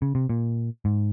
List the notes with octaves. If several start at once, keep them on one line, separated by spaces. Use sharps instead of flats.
C#3
C3
A#2
G#2